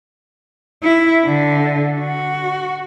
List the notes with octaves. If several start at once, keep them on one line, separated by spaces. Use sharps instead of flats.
E4
D3
F#4